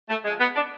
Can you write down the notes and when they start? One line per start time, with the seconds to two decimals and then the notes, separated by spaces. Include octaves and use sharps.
0.09 A3
0.24 C#3 G#3
0.28 F3
0.40 B3
0.55 D4